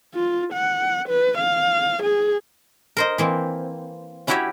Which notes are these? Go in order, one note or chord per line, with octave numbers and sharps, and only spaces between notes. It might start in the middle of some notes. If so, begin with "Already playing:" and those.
F4
F#5
B4
F5
G#4
A#4 C5 D#5
E3 A#3 C4
C#4 E4 F#4 G4 C#5 E5